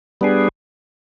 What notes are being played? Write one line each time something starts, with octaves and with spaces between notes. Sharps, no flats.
G3 B3 D4 G#4